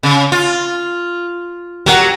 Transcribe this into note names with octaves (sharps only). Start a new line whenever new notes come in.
C#3
F4
F#3 G4 A#4 F#5